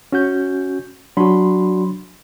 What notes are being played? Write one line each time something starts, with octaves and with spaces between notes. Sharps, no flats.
C#4 F#4 G6
F#3 D4 F#4 B5 C6